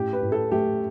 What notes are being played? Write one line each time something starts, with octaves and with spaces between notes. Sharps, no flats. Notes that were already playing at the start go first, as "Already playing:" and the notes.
Already playing: A2 C#4 G4
B4
A2
A4
A3 G4